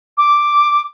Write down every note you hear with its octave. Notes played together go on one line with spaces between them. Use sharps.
D6